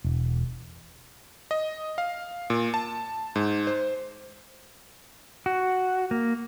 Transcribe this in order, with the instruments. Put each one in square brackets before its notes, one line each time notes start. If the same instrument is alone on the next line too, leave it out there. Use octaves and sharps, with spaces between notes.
[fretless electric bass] E1
[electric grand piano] D#5
F5
A#2
A5
G#2
C5
[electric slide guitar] F#4
A#3